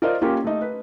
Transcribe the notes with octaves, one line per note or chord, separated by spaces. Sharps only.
F4 A#4 C5 D5 D#5 F5
A#3 C#4 F4 G4
A3 D#4
B4